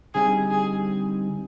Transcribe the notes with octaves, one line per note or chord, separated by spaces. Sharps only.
D3 G3 C4 D#4 G4 G#4
G#4